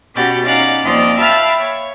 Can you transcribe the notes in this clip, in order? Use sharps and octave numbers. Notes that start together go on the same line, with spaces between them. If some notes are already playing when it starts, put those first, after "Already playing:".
B2 C#4 F#4 G4 B5 A6
C#4 D#4 D5 F5 F#5
D#2 F3 C4 D5 D#5
E5 F5 G5 A5 B5 F6
C#5